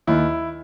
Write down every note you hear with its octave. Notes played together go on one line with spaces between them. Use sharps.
D#2 D#3 E4